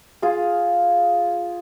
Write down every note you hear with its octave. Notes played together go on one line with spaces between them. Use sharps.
F4 G#4